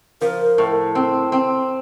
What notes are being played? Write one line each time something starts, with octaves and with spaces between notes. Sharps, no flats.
F3 A#4
A2
C4
C4